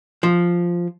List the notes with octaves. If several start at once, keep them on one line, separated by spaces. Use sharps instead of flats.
F3